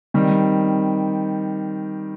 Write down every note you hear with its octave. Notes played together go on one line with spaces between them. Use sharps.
D#3 G3 C4